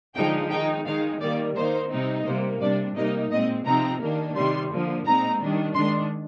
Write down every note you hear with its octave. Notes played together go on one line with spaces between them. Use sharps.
D3 F3 G#3 D#4 G5
D#3 G#3 D#4 G5
D#3 G#3 D#4 F5
D#3 G3 A#3 D5
D#3 A#3 D#4 C5
C3 G3 C4 D#4
C3 G3 A#3 C5
C3 G3 D4 D5
C3 G3 A#3 D#4 D#5
A#2 G#3 C4 D#5
C3 F3 C4 D#4 A#5
D#3 A#3 D4
C3 D#3 G3 C6
D3 F3 A#3
A#2 G#3 C4 D#4 A#5
D#3 G3 D4
D#3 G#3 D4 C6